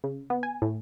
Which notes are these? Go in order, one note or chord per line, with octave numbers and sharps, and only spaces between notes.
C#3
B3
G#5
A2